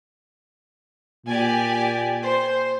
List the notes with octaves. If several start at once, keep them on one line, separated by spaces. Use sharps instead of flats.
A#2 G4 D5 G#5
C5